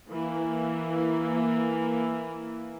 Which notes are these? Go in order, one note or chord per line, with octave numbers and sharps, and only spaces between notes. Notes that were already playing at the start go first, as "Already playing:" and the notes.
E3 A#3